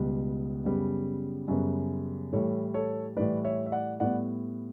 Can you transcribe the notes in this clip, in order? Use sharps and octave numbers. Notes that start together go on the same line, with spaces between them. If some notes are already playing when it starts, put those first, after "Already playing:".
Already playing: C#2 B2 G3 B3
F#2 C#3 G3 B3
F#2 C#3 G3 B3
A2 E3 G3 A4 C#5
A4 C#5
A2 E3 G3 B4 D5
C#5 E5
E5
D5 F#5
A2 G3 B3 D5 F#5